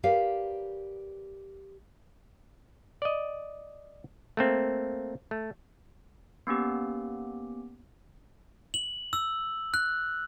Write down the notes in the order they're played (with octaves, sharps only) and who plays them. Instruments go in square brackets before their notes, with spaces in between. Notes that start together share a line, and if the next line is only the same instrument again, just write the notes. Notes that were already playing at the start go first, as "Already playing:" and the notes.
[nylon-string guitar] G4 A#4 B4 D5 F5
[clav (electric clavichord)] D5 D#5
A3 A#3 C4
A3
[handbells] A#3 B3 C#4 G4
[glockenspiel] F#7
E6
F#6